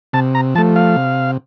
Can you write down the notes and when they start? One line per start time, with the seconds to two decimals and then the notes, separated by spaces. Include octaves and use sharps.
0.13 C3 A5
0.35 A#5
0.55 F3 A5
0.58 A3
0.76 F5
0.96 C3